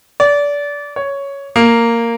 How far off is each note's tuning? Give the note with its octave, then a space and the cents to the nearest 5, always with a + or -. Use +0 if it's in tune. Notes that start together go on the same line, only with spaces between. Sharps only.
D5 -25
C#5 +5
A#3 -10